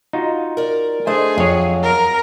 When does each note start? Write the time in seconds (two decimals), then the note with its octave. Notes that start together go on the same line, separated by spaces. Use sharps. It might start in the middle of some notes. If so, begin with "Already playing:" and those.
0.13 D#4 F4 F#4
0.57 A#4 D5
1.07 A3 D4 E4 G#4 C5 D#5
1.38 F2 F#3 C#5
1.83 A#4